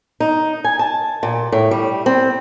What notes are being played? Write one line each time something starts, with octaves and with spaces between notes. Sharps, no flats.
D#4
G#5
A5
A#2
A2
G3
C4